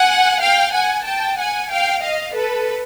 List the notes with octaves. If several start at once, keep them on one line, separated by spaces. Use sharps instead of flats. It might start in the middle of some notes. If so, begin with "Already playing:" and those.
Already playing: F#5 G#5
F5 G5
F#5 G#5
G5 A5
F#5 G#5
F5 G5
D#5 F5
A4 B4